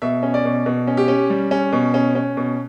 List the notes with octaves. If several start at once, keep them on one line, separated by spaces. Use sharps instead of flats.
B2 E5
C#4
D5
B2
B2
C#4
G4
C#4
G3
C#4
B2
C#4
C#4
B2